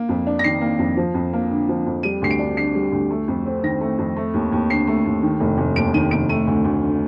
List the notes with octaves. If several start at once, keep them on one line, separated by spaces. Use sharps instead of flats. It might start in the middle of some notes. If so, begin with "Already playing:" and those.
Already playing: A#3
F2
D4
A#6
D#3 C7
A#3
F2
F3
F2
A#3
D3
F3
F2
G3 D#7
D2 C7
D7
D4
D3 C7
G3
D2
A3
F2
C4
D#3 A#6
A3
F2
A3
D#2
D#2
D3 C7
A3
D#2
D#3
F1
F1
D#2 D7
D#3 D#7
F1 D7
A3 D#7
D2
D2
D3